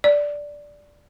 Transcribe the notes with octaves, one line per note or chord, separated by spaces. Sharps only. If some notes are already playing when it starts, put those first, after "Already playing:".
D5